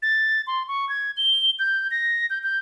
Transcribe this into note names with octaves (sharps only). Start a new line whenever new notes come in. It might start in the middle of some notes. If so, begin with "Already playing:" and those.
A6
C6
C#6
G#6
G7
G6
A#6
G6
G6